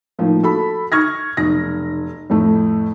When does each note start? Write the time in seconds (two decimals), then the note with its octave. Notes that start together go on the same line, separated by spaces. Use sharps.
0.19 A2 D#3 F3 A#3
0.43 F#4 A4 B5
0.92 C#6 F6 G#6 A#6
1.37 F1 B1 A#6
2.30 F2 A2 A3